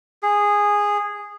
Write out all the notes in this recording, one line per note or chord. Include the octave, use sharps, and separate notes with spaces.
G#4